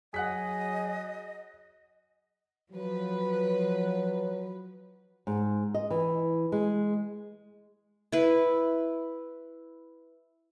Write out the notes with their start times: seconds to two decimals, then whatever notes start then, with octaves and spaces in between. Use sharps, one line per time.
0.14 F#3 G#4 D#5 F#5 F#6 B6
2.72 F3 F#3 B4
5.27 G#2
5.74 D#5
5.90 E3
6.52 G#3
8.12 E4 B4